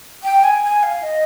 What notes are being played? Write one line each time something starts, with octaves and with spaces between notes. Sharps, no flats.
G5
G#5
G#5
F5
D#5